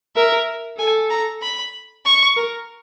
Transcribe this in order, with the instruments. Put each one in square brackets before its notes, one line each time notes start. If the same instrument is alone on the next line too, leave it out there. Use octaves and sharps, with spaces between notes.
[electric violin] A#4 [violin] E5
[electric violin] A4 [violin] G#5
[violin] A#5
B5
C#6
[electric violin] A#4